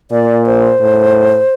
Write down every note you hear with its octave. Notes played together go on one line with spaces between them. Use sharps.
A#2 D5
C5
A2